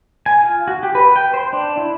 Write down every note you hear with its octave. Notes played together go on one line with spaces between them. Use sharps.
G#5
F4
F#4
G4
B4
G5
C5
D4
E4